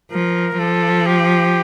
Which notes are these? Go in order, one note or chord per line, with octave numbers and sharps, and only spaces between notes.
F3 A#4
F3 A4
G4